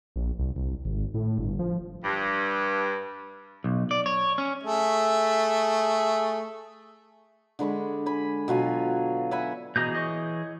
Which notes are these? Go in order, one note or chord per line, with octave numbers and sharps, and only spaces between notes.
A#1
C2
C2
G#1
A2
G1
F3
G2
B1
D5
C#5
C#4
A3 G#4 E5
D3 G#3 B5 C#6
G#5 B5
B2 F#3 F4 G#5
E5 F#5 G#5 B5
B2 E3 G#4 D#5 A#5 G6
C#5 D#5